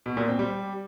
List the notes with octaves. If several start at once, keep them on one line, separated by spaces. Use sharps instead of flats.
B2
A#2
C4
G3